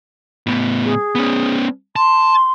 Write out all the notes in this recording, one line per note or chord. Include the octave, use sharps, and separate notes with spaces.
A2 B3
G#4
B3 C#4
A5 C6